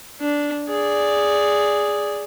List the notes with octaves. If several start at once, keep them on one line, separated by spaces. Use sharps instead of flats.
D4
G#4 D5